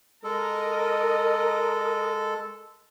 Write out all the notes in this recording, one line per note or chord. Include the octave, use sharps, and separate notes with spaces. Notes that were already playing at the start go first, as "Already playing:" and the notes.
G#3 A4 A#4 D#5